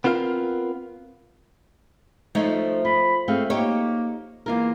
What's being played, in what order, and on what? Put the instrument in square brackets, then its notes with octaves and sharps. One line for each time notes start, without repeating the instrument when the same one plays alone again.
[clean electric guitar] B3 C4 F4 A#4 F5
[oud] F3 [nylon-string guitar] A3 D#4 C#5
[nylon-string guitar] F4 [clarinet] B5
[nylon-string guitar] A3 C4 G#4 [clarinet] F5
[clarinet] A#3 [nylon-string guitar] D#4 G4 [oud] C#5
[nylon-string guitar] E2 F4 A#4 [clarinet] A#3